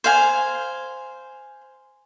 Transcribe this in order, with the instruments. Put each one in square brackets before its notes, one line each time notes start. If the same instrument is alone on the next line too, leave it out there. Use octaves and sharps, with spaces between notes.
[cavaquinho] C5 F5 G#5